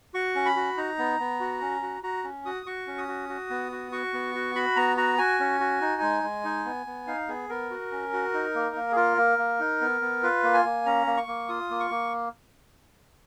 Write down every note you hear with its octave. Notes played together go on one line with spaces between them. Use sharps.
F#4 C#6
C#4
B5
F#4
D#4 A#5
B3
B3
F#4
C#4
F#4
F#4 A#5
C#4
F#4 D#6
F#4 C#6
C#4
D#6
F#4
F#4
B3
F#4
F#4 C#6
B3
F#4
F#4 B5
B3 A#5
F#4 A#5
F#4 G#5
C#4
F#4
D#4
G#3
G#3
D#4
B3
B3
D#4 F5
B3 G#4
B3 A#4
F#4
C#4
F#4
D#4
A#3
A#3
G#4
F4 A#4
A#3
A#3
D#4
B3
B3
F4 B4
A#3
G#5
A#3
C#4 A#5
A#3
C#6
A#3
F4 D#6
A#3
C#6
A#3